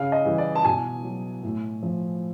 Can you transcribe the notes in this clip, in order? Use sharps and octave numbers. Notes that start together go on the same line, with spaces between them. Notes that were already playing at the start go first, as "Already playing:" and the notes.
Already playing: C#3 F5
D#5
E3 G3
D5
A5
B2 G#5
F#3
A2
F3